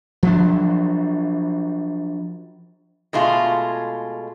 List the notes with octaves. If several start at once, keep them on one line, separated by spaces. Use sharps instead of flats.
F3 F#3 D4
B2 G#3 A3 F4